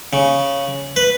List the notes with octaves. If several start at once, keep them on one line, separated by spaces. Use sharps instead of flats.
C#3
B4